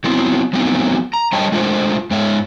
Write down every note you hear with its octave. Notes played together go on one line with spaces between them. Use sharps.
F#3 B3 C4 E4
F3 F#3 A3 B3 C4 D#4
A#5
G3 D4 C#5 D#5 G5 A5
G#3 A3 D4 F4 C5
G#2 G#3 C#5 E5